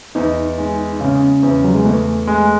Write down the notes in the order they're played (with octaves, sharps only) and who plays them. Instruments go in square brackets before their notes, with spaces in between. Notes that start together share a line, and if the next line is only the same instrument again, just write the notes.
[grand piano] E2 [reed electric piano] D#4
[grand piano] G#3
[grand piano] C#3 [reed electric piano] C#4
[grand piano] E2
[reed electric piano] F#3
G#3
[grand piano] E2 [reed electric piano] A3
[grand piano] G#3